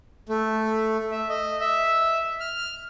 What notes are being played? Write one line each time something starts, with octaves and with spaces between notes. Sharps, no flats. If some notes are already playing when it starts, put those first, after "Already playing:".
A3
E5
D#5
E5
F6